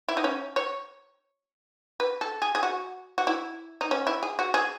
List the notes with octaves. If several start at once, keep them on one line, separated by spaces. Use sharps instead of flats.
E4
D#4
C#4
C#5
B4
A4
G#4
G#4
F#4
F#4
E4
D#4
C#4
E4
G#4
F#4
G#4